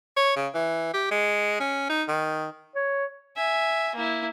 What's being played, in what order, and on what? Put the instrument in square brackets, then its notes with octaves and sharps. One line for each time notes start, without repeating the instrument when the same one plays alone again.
[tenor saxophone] C#5
C#3
E3
G4
G#3
C#4
D#4
D#3
[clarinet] C#5
[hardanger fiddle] E5 G#5
A#3 E4